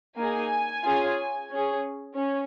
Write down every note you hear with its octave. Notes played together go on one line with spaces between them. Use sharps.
A#3 D#4 G#4 G#5
C#4 F4 G#4
C#4 G#4
C#4